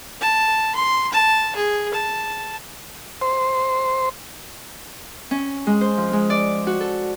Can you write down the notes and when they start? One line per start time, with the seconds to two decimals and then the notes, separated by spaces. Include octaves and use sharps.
0.21 A5
0.75 C6
1.12 A5
1.55 G#4
1.94 A5
3.21 C5
5.31 C#4
5.67 G#3
5.81 C5
5.98 F3
6.13 G#3
6.30 D5
6.67 F#4
6.81 A4